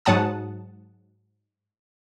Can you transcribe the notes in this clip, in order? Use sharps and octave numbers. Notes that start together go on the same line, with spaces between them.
G#2 F#3 F#5 A5 D#6